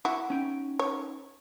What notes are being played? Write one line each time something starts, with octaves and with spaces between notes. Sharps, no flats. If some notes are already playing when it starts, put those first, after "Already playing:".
E4 F#4
C#4 D#4 G5
C#5